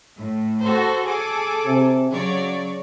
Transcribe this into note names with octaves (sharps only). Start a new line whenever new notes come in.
A2
F#4 A4 C5
G#4 A4 D6
C3
C#3 F#3 C#5 D5